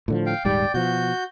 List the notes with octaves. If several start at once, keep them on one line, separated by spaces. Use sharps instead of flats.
A2 D3 F3
F5 G5
D#1 G#2 G3 D5 G5
B2 F3 F#4 G6